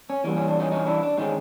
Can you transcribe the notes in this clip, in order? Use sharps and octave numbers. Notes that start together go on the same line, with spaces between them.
C#4
E3 G3 A#3 C#4
C#4
D4
C#4 D#4
C#4 D#4
D4 E4
D4
D#3 G#3 C4 C#4 D#4